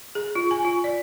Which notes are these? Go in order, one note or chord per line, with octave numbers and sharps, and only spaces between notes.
G#4
F4
G#5
F4
D5